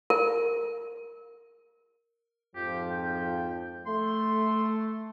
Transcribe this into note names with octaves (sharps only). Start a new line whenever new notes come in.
A#4
F2 G#2 F3 G4
G5
A3 C6